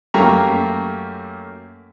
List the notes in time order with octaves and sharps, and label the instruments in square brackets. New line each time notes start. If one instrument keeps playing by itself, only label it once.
[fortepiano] F#2 A3 A#3 G4 A#5 C#6